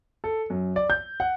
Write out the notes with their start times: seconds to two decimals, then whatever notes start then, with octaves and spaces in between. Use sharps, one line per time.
0.24 A4
0.50 F#2
0.76 D5
0.90 G6
1.20 F#5